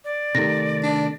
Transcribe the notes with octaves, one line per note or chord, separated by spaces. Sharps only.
D5
C3 D#3 A3 A#6
D4